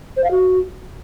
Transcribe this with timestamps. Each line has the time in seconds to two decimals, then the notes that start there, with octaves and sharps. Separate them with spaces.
0.17 C5
0.24 F5
0.31 F#4